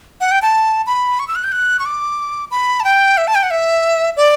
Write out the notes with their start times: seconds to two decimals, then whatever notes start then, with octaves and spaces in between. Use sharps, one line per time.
0.21 F#5
0.31 G5
0.42 A5
0.86 B5
1.19 C#6
1.28 E6
1.36 F#6
1.44 G6
1.52 F#6
1.79 C#6
1.86 D6
2.51 B5
2.80 A5
2.84 G5
3.17 E5
3.27 A5
3.35 G5
3.43 F#5
3.51 E5
4.17 D5